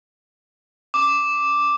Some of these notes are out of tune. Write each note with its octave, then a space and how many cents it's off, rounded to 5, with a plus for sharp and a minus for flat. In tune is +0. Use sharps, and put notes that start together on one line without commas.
D6 +0